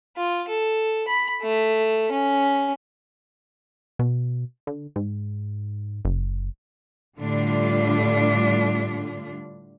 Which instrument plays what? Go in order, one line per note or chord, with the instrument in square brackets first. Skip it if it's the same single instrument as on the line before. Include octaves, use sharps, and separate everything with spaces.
[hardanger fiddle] F4
A4
B5
A3
C#4
[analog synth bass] B2
D3
G#2
F#1
[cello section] A2 D3 G3 D4 F4